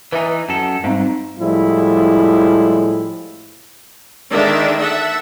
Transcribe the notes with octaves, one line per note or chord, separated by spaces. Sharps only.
E3 D#4 B4 E5 G#5
F#2 A4
G#2 G3 C4 D#4
A2 F3 G3 G#3 E4
D3 D#3 G#3 D4 E5
E5 F#5 A5